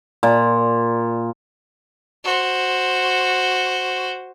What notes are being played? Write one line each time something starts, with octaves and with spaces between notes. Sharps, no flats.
A#2
F#4 C5